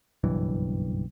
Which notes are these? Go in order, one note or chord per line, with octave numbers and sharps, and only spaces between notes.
F#1 B1 G2 E3